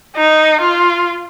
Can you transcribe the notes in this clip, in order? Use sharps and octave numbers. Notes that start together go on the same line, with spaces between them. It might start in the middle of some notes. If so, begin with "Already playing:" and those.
D#4
F4